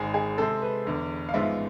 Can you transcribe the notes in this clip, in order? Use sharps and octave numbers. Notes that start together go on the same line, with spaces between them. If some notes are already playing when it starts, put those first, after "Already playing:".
Already playing: G#1 G#2 G#3 G#4
G#4
C3 G#3 C4 A4
B4
E1 E2 D3
F5
A1 G#2 F3 G#3 B3 E5